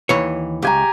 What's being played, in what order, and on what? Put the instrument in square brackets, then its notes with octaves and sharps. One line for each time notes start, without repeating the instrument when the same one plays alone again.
[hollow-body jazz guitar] D#2 E3 C#5
[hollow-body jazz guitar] C#2 [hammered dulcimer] G4 G#5 A#5